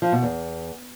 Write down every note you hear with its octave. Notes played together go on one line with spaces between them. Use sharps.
F3
B2
E2